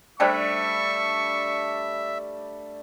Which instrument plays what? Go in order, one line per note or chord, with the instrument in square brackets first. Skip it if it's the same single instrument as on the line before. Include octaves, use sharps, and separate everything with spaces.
[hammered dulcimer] G3 A3 D4 [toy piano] C5 D5 G5 [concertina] E5 [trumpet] C#6